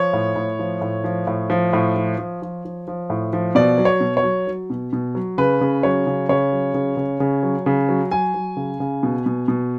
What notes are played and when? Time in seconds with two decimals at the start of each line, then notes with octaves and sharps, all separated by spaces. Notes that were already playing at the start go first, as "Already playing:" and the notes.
Already playing: F3 C#5
0.13 A2
0.36 A2
0.59 F3
0.81 A2
1.04 F3
1.27 A2
1.50 F3
1.73 A2
1.96 F3
2.18 F3
2.42 F3
2.65 F3
2.88 F3
3.10 A2
3.33 F3
3.55 B2 D5
3.78 F#3
3.85 C#5
4.00 B2
4.17 C#5
4.23 F#3
4.47 F#3
4.70 B2
4.93 B2
5.15 F#3
5.38 C#3 B4
5.61 C#3
5.83 F#3 C#5
6.07 C#3
6.29 C#3 C#5
6.52 F#3
6.74 C#3
6.97 C#3
7.20 C#3
7.43 F#3
7.66 C#3
7.89 F#3
8.11 F#3 G#5
8.34 F#3
8.57 C#3
8.80 C#3
9.03 B2
9.26 B2
9.48 B2